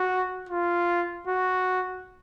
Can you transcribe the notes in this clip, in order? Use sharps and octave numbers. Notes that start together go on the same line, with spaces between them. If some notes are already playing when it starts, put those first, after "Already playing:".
Already playing: F#4
F4
F#4